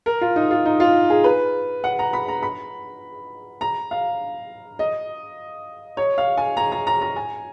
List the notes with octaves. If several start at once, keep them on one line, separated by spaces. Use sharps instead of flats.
A#4
F4
D#4
F4
D#4
F4
G#4
B4
F#5
A#5
B5
A#5
B5
A#5
F5
D#5
C#5
F5
G#5
A#5
A#5
A#5
A#5
G#5